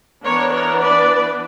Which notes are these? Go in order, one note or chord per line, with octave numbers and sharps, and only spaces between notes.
E3 B3 D4 A#4 C#5
A#4 C#5
B4 D5